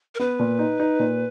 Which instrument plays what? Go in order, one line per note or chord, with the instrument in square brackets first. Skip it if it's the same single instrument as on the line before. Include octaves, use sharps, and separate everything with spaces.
[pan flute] A#4
[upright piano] B3 [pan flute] B4
[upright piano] A#2
D#4
D#4
A#2